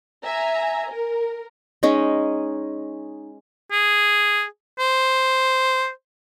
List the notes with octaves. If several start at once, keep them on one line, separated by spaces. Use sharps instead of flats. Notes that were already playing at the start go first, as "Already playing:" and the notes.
E5 G#5 A#5
A#4
G#3 C#4 D#4
G#4
C5